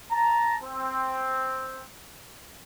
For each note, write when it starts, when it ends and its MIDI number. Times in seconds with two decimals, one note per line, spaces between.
0.11 0.57 81
0.11 0.57 82
0.63 1.83 60